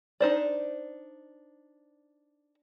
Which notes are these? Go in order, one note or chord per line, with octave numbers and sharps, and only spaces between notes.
D4 D#4 C5 D5